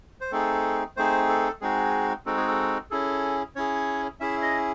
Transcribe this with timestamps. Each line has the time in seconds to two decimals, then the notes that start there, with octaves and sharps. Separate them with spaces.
0.21 C5
0.32 A3 C4 D#4 G#4 A4
0.97 A3 C4 D#4 G#4 C5
1.29 A4
1.61 G#3 C4 D#4 F#4 G#4
2.26 G#3 C4 D#4 F#4 A4
2.37 G#4
2.48 A4
2.91 C#4 E4 G#4 A4
3.56 C#4 E4 G#4 C#5
4.20 C#4 E4 G#4 E5
4.42 D#5